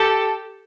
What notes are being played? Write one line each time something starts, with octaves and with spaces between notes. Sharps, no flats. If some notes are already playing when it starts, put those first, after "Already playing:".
Already playing: G4 A4